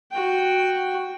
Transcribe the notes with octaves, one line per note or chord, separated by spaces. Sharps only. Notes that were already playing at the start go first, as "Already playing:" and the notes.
F#4 G5